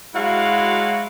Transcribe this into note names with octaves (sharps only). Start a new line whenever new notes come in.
F#3 G#3 E4 F#4 F5